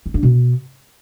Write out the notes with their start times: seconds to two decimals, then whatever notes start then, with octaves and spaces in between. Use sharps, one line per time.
0.06 C#4
0.14 D4
0.23 B2